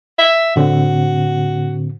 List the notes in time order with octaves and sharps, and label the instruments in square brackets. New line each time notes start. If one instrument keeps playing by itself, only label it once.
[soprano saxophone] E5
[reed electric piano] A2 D3 C4 [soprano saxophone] F#4